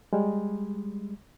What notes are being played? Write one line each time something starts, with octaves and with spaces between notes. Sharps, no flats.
G3 G#3